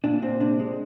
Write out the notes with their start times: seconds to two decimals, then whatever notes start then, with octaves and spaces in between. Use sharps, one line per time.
0.04 A#2 D4
0.22 A#2 C4
0.40 C3 D4
0.59 G#3